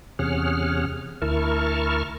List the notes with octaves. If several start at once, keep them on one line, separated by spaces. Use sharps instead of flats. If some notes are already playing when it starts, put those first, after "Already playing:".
E2 C3 C#4 G#4 F#5 F6
D2 E4 A#4 A5 C#6 F6